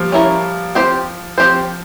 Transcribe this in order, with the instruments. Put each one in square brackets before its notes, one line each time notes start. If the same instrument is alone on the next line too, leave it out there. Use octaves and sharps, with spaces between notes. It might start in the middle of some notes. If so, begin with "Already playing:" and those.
Already playing: [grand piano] F3 G3 A#3
[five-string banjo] C#4 E4 A#4 C#5
C4 G4 C5
[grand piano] F3 [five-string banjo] C4 G4 C5